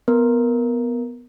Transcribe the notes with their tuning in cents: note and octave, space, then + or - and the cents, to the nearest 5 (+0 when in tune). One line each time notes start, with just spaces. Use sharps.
B3 +0 A#4 +0